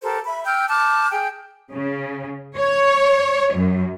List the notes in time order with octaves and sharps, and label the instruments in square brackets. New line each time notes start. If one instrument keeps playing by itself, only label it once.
[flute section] G4 A4 A#4 C5
E5 B5
G5 E6 F6 G6
A5 D6 F6 G6
G#4 G5
[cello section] C#3
C#5
F#2